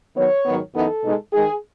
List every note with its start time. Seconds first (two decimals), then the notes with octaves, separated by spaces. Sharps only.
0.16 D#3 F#3 B3 C#5
0.46 G#2 D#3 F#3 B3
0.75 F#2 E3 B3 D#4 A4
1.04 B2 G#3 D#4
1.33 D#3 G#3 D#4 G#4